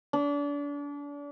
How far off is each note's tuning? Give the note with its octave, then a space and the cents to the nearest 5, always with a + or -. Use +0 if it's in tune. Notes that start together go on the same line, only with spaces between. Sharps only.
D4 -35